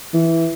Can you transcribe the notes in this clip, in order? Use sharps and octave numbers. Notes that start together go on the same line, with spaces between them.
E3